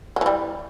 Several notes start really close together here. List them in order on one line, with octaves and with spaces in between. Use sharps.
F#3 E3 G3